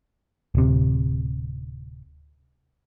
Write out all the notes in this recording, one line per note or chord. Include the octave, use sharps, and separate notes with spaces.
D1 C3